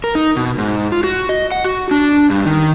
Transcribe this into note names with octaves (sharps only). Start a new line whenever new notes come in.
A#4
D#4
B2
G#2
F4
F#4
D#5
F#5
F#4
D4
G2
D#3